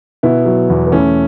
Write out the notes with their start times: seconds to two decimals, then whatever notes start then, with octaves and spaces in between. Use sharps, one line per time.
0.23 B2 B3 E4
0.46 F#3
0.70 E2
0.86 B3
0.92 E3 A3 C#4